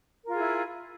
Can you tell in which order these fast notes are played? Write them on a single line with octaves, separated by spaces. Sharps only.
A#4 F4 G#4 E4